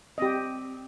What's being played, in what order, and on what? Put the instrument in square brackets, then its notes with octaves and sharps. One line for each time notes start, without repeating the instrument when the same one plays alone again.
[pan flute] C4 [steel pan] G4 D#5